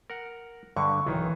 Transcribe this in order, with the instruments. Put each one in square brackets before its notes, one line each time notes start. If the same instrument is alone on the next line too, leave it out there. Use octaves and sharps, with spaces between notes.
[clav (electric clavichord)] A#4 F#5
[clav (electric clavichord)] G2 D3 [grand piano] C#6
[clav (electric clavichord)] B1 D#3 C#5 [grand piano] E3